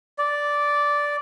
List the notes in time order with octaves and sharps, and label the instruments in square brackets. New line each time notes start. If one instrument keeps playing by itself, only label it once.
[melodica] D5